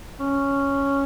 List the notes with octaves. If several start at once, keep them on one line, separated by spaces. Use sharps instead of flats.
C#4